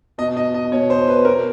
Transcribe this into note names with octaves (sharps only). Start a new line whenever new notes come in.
B2 D#5
D#5
D#5
B2 C#5
C5
B4
B2 A#4